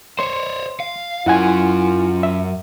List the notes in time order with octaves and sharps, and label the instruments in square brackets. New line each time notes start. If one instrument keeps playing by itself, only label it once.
[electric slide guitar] C5 C#5 [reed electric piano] C6
[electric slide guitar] F5
[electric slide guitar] F#2 C#4 [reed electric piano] E4 F#5 G#5 [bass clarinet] F4
[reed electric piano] E5